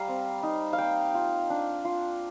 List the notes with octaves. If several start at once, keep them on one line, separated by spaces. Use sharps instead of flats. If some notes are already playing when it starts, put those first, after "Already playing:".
Already playing: G3 F5 A#5
C4
D#4
F5
A#3 G5
F4
D4
F4